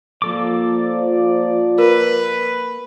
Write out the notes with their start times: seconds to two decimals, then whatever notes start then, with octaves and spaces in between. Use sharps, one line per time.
0.22 F3 A#3 A4 D5 D6
1.79 A#4 B4